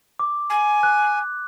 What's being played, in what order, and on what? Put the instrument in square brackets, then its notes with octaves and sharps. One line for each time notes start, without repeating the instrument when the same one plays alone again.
[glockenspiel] D6
[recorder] G#5
[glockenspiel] F#6